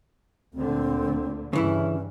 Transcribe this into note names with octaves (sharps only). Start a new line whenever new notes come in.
D2 A#2 D3 C4
G2 C#3 E3 C#4 E4